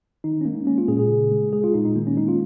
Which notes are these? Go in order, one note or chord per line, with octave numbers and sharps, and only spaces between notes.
D#3 D#4
C#4
G#3 A#3
G#3 C#4
F4
A#2 G#4
G#4
C#3
G#3
G#3 G#4
F4
A#2 D#4
D#4
D#3 A#3
C#4
G#3 D#4
F4